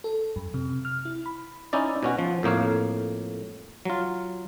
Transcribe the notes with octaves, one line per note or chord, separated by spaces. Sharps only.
A4
F#2
C3
F6
E4
B5
C#4 D#4 E4 D5
B2 C#4 F#4
F3
F2 A2 A#3 C#5 F5
F#3 F4